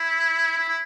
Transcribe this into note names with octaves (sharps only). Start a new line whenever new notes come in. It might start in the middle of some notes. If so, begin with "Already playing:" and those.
Already playing: E4
E4
E4